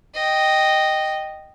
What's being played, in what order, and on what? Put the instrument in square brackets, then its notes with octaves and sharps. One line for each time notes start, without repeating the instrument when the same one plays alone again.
[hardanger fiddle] D#5 G5